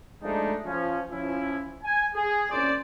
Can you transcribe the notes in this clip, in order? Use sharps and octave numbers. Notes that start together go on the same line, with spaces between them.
F3 G#3 A3 D4 D#4
F3 C#4
F3 C#4 E4
G#5
G#4
C2 A#2 C#4 C5 D5